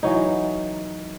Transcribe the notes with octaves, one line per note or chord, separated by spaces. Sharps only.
E3 F#3 D#4